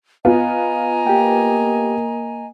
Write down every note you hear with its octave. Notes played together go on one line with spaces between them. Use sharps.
B3 F4 D#5 G#5 A#5
A#3 G4 G5